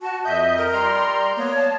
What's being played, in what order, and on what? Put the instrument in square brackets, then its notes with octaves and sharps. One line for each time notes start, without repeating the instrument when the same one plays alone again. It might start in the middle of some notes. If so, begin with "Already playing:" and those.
[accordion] F#4 [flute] A5
[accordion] F2 D#5 G6 [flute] E5
[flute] A#4
[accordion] G3 A#5 C6
[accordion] A#3 B3 [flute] C#5
[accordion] A5